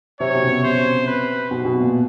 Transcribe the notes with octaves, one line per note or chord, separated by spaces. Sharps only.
C3 C#5
B2
C#3
C3
C3 C5
B4
B2
B2
A#2